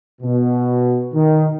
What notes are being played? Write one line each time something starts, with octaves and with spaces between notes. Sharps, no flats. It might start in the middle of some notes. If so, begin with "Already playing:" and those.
B2
D#3